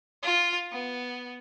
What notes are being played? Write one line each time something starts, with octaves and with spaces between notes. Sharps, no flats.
F4
B3